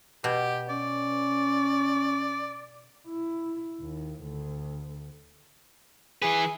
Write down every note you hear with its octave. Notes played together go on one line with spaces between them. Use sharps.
B2 G4
C#4 D5
E4
D#2
D2
E3 G#4 B4